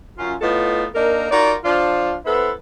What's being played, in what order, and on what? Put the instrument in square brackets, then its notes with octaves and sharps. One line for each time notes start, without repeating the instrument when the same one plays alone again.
[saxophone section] F#2 C#4 F4
A2 B3 D#4 F4 A4
A#3 D4 D#4 A#4
D#4 F4 F#4 A#4 D5
F3 D4 F4
B3 E4 A4 B4 C5